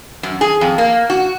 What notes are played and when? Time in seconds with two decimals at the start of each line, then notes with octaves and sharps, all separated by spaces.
0.23 F#2
0.41 G#4
0.61 F2
0.78 A#3
1.10 F#4